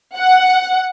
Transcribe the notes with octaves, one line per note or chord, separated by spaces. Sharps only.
F#5